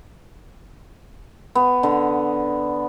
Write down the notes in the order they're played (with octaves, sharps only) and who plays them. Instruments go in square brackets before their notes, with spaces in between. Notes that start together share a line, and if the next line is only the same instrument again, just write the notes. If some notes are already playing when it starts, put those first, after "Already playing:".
[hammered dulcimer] B3
D3